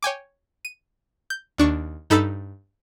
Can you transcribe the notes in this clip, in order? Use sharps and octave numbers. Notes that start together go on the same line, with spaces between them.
C#5 G5 G#5 D6
D#7
G6
D#2 D4 C#6
G2 D#4 A4 B5 E6 A6